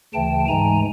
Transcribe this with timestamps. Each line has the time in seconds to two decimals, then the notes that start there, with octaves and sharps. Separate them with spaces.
0.14 D2 C#3 E3 A3 G5 A5
0.48 G#2 E3 G#3 G#5 A#5